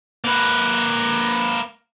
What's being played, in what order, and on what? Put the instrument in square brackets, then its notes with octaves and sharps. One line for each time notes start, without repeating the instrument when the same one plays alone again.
[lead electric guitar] A#3 B4